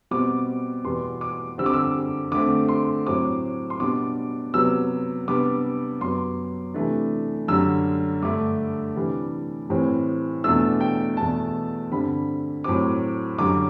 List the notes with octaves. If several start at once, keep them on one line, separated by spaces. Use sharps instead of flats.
B2 G3 C4 D6
E2 B2 G3 B3 C6
D6
D3 G3 C4 E6
D6
E6
D3 A3 C4 D6
C6
A2 F#3 C4 D6
C6
B2 G3 D4 D6
C3 F#3 B3 E6
C3 G3 B3 D4 D6
F#2 F#3 B3 C6
C3 E3 A3 D4
F#2 D3 G3 E6
G2 D3 A3 D6
C3 E3 G3 D4
A2 E3 G3 C4
E2 B2 A3 D4 E6
G5
E2 B2 A3 A5
G2 D3 G3 C4 B5
A2 F#3 C4 D6
F#2 D3 G3 D6